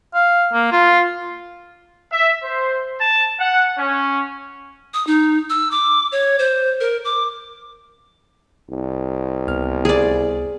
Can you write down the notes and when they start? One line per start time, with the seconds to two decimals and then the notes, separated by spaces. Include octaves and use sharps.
0.14 F5
0.53 A#3
0.72 F4
2.12 E5
2.44 C5
3.01 A5
3.40 F#5
3.78 C#4
4.94 D#6
5.07 D#4
5.50 E6
5.71 D6
6.12 C#5
6.39 C5
6.80 A#4
7.05 D6
8.70 C2
9.48 C#2 B3 F6
9.85 G#4 D5